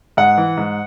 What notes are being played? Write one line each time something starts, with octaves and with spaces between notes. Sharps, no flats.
G#2 F#5
E3
G#2